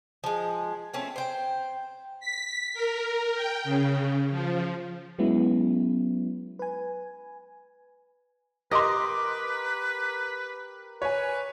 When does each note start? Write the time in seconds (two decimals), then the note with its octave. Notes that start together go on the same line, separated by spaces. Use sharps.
0.24 F3 G#3
0.94 A3 C4 C#4
1.16 C5 G5
2.20 B6
2.73 A#4
3.35 G5
3.64 C#3
4.30 F3
5.19 F#3 G#3 B3 C#4 E4
6.59 B4 G#5
8.71 G4 A#4 B4 D#5 C6 D6 A#6
11.02 B4 C#5 G#5